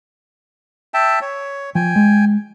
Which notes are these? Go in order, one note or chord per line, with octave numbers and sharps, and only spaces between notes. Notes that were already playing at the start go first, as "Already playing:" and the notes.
E5 G5 A5
C#5
F3 G5 G#5
G#3